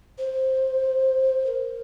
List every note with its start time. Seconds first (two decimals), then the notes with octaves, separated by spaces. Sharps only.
0.18 C5
1.46 A#4